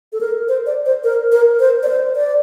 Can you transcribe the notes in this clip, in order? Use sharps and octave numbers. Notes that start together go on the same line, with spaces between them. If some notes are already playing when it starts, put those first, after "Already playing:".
A4
A#4
C5
D5
C5
A#4
A#4
C5
D5
C5
D5